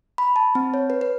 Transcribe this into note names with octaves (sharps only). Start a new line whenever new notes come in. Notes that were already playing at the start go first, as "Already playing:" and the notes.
B5
A5
C4
C#5
B4
B4